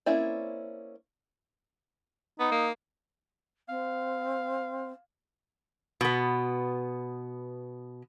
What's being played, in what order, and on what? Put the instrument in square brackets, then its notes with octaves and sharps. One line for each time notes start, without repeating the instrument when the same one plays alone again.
[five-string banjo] A#3 C4 C#4 E4 D5
[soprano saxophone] B3 [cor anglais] D#4
[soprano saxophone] A#3
[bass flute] C4 [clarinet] F5
[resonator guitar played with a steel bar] B2 B3